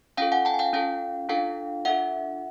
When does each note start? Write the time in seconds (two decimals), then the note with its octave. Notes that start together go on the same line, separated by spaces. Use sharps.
0.17 C#4 F4 A4 F5 G5
0.32 F#5 G#5
0.45 G5 A5
0.54 G#5
0.59 F5 G5
0.73 C#4 F4 A4 F5 G5
1.29 D4 F4 A4 F5 G5
1.85 D4 F4 A4 E5 F#5